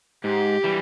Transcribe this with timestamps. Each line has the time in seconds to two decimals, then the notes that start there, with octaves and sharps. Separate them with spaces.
0.24 G#2 G4
0.64 E3 G3